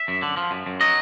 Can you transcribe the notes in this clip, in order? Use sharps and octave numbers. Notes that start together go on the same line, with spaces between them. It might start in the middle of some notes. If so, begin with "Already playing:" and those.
Already playing: E5
F#2
D3
F3
F#2
F#2
F#3 D#5